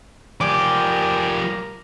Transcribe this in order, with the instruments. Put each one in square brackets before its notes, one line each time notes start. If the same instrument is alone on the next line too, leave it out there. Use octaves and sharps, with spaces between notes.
[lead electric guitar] F3 G4 [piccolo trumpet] A#4 [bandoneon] D5 G5 G#5 [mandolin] D6